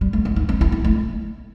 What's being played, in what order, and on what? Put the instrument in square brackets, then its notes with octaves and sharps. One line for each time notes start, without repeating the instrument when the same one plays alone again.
[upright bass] G3
A3
C4
D#4
C4
E4
C4
A3